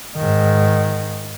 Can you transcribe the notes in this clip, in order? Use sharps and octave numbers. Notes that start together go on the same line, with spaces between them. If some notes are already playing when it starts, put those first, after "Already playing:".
G#2 D#3